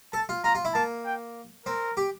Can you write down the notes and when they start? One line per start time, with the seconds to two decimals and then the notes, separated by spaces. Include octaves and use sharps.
0.13 A4 A5
0.29 F4
0.44 F4 A#5
0.55 F4
0.65 E4
0.75 A#3 A5
1.06 G5
1.66 C4 A#4
1.97 G4